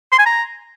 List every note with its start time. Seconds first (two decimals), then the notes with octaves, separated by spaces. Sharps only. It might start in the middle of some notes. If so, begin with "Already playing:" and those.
0.12 C6
0.19 G#5
0.26 A#5